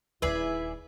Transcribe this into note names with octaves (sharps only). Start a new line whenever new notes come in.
D#1 D#2 E4 G#4 B4 D5 E5